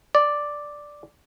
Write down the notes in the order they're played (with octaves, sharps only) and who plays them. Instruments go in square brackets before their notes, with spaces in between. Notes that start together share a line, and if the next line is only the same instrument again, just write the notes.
[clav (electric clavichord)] D5